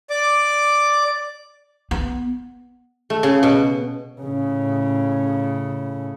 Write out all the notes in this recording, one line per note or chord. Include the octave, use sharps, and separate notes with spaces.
D5 D6
B3
A3
C#3
B2
A2 C#3